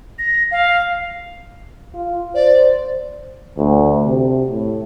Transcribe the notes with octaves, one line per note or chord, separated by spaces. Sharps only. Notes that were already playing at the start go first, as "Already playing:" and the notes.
A#6
F5
F4
C5 D5
D2
C3
A2